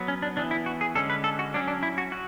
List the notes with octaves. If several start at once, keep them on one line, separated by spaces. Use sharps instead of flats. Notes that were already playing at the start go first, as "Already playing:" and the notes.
Already playing: F#3 B3
C#4
D4
E3 B3 D4
E4
F#4
G#4
D3 G#3 C#4 A4
B4
A4
F#4
F#3 C#4 D4
D4
E4
F#4
F#3 F#4